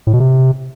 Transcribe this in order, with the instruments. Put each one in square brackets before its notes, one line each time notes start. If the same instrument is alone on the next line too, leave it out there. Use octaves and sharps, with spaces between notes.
[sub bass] A2
B2
C3